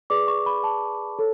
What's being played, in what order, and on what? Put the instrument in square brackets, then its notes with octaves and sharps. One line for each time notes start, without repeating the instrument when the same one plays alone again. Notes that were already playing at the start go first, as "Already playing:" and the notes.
[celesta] G#4 B4 D5 D6
C#6
B5
A5
A4 C#5